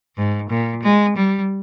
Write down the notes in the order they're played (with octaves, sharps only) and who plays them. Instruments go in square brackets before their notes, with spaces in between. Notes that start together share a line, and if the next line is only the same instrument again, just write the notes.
[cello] G#2
A#2
G#3
G3